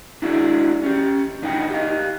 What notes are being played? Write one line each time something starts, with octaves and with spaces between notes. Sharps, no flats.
D4 E4 F#4 G#4 C#5 D5
C#4 G4
A#2 D4 D#4 D#5 F#5 G5
G4 D#5 F5